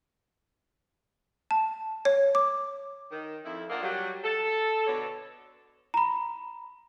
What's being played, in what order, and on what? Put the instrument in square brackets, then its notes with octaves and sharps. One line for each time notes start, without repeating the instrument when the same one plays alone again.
[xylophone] A5
C#5
D6
[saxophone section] D#3
F2 E4
F2 A#2 A#3 D4 D#5 F#5
F#3 G3
A4
B2 D3 C#5
[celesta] A#5 B5